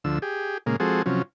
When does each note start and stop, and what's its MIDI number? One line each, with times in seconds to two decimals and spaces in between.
0.04 0.19 38
0.04 0.19 50
0.04 0.19 53
0.04 0.19 88
0.22 0.58 67
0.22 0.58 68
0.66 0.76 46
0.66 0.76 49
0.66 0.76 56
0.66 0.76 58
0.80 1.02 53
0.80 1.02 56
0.80 1.02 60
0.80 1.02 66
0.80 1.02 68
0.80 1.02 69
1.06 1.22 48
1.06 1.22 53
1.06 1.22 54
1.06 1.22 61